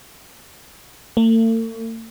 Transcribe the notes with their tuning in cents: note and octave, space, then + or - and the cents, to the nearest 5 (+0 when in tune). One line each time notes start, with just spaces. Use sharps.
A3 +45